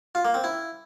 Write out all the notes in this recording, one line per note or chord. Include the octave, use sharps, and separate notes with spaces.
F4
A#3
C4
E4